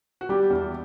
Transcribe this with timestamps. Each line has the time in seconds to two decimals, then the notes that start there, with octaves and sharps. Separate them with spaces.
0.21 F#4
0.29 G3 G4
0.50 E2